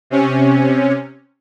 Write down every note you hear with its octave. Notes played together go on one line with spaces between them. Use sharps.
C3 C#4